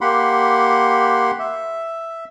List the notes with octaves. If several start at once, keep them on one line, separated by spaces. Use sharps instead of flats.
A#3 G4 F#5 B5 C6
E5